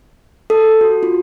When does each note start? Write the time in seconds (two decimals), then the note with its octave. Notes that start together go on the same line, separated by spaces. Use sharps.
0.50 A4
0.81 F#4
1.03 F4